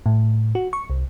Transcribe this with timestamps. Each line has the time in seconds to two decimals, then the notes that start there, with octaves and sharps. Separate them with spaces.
0.06 A2
0.55 F#4
0.73 C#6
0.90 C2